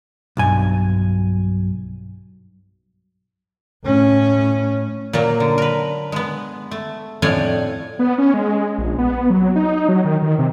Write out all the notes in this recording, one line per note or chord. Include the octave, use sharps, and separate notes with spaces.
B1 G2 G#5
A2 C#4
A#2 F#3 A#3
D3
A#4 B4
G#3 B3
A3
F2 A2 D4 C#5 F#5 G#5
B3
C#4
G#3
A#1
B3
F#3
D#4
F#3
D#3
D#3
C3